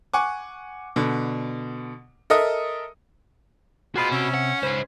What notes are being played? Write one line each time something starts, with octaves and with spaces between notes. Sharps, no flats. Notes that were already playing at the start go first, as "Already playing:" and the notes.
F#5 G#5 C#6 D6
B2 D3
A4 A#4 D#5 E5 D#6
F4 F#4 G#4 C5 D#5 B5
C3 C#4 E5
F#5
C#2 G#4 B4 C5